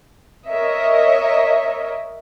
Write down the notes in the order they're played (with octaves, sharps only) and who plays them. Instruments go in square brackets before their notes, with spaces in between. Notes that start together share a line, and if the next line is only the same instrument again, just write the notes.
[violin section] A#4 C#5 D#5 E5